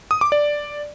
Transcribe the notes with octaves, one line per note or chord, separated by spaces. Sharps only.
D#6
D6
D5